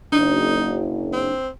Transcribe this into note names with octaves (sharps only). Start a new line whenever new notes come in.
F#1 D4 D#4
C4